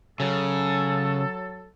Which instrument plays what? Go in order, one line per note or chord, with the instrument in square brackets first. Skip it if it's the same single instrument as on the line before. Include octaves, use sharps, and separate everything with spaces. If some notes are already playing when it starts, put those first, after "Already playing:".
[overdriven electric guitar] C#3 [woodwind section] F#3 A4